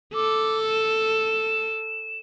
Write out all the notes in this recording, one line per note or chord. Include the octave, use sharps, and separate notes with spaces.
A4 D6
E7